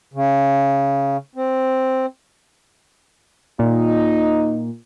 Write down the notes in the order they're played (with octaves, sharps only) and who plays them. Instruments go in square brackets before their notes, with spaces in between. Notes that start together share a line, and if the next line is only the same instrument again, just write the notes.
[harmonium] C#3
C4
[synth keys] A#2 [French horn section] D#4